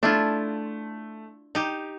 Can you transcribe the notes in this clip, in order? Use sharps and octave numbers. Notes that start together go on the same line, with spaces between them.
A3 D4 E4 F4
D#4 G4